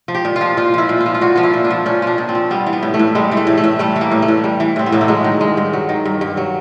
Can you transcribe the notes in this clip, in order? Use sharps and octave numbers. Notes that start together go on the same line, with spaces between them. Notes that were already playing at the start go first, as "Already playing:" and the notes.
F3
G4
A#2
F4
F3
A#2 F4
F3 E4
A#2
F4
F3
F4
A#2 F#4
F3 F4
E4
A#2
D4
F3
A#2 C#4
F3 D4
A#2
C4
F3
G3 B3
E3
B3
A2
A3
A2
G3 G#3
E3
A3
A2
A3
A2
G3 A3
E3
A#3
A2
A3
A2
G3
E3
A2 C4
B3
A2 A#3
A3
F#3 G#3
D#3
G2 G#3
G2
F#3
D#3
G2
G2
F#3